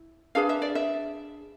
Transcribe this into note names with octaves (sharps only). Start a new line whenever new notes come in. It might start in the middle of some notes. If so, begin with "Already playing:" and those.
Already playing: E4
D4 G#4 B4 F5
E5
D5
E5